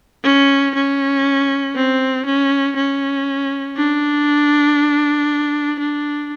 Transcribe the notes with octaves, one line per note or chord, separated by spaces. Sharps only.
C#4
C#4
C4
C#4
C#4
D4
D4